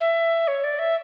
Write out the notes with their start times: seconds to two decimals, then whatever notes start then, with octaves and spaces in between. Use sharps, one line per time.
0.01 E5
0.48 C#5
0.64 D5
0.79 E5